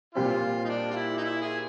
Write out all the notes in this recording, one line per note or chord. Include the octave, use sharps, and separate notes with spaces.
A#2 G3 C4 F4
D#4
D4
F4
E4
D#4
E4
G#4